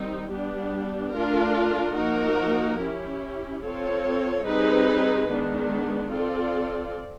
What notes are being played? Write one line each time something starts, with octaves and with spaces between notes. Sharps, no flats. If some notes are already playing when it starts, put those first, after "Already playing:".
Already playing: D#3 G3 C4 D#4
G3 B3 D4 G4
A3 D4 F4 A#4
F3 A#3 D#4 F#4 A#4
C#4 E4 G4
C4 F4 A4 C#5
G3 C4 D#4 G#4 B4
D#3 G#3 B3 D4
C4 F4 A4 D5